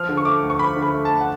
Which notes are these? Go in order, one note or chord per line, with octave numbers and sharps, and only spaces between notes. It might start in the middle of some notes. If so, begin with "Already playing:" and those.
Already playing: F3 F6
D3
C#6
A3 D6
D2
C#6
F3 B5
D3
B5
A3
A5
D2
F#5